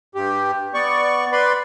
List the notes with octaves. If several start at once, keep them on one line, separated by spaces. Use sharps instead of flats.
G2 G4
B3 D5 C#6
B4 D5 B5 C6